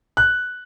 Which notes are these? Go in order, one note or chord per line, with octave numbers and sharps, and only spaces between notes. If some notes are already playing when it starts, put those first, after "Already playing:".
F#6